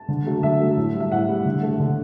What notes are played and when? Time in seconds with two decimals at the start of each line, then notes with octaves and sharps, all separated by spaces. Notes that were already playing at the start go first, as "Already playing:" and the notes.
Already playing: A5
0.08 D3
0.26 F#3 A3
0.43 D3 E5
0.60 F#3 A3
0.77 A2
0.94 G3
1.00 E5
1.12 A2 F#5
1.28 G3
1.46 D3
1.63 A3
1.80 D3